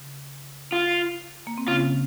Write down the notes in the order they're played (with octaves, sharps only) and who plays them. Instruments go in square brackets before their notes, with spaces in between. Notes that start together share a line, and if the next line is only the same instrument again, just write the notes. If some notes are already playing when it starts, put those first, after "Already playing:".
Already playing: [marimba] C#3
[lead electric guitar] F4
[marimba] A#3
C4
[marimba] C#3 C#4 [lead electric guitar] F4